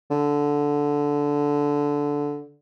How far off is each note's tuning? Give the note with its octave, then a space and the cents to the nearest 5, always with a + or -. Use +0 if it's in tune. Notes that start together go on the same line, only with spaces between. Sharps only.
D3 -10